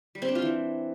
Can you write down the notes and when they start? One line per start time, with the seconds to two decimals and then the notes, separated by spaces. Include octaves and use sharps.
0.15 G3
0.22 C4
0.29 D4
0.35 F4
0.42 E3